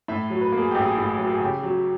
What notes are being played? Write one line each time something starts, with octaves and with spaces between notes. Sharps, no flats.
A2 E5
F#3
B4
A#3
G#4
A1 G4
G#4
A2
F#3
G#4
C#3 G4
F#3